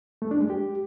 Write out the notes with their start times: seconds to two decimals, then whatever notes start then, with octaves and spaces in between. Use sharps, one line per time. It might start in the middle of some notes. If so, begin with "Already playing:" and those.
0.22 A3
0.31 D4
0.40 G#3
0.50 G4